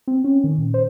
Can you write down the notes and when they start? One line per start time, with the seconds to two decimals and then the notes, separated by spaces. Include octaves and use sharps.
0.08 C4
0.24 C#4
0.44 D#3
0.58 A#2
0.74 C5